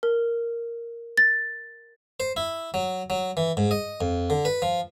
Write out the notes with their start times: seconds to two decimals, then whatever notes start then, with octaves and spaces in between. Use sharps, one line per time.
0.03 A#4
1.18 A6
2.20 C5
2.37 E4
2.74 F#3
3.10 F#3
3.37 E3
3.57 G#2
3.71 D#5
4.01 F2
4.30 D3
4.45 B4
4.62 F3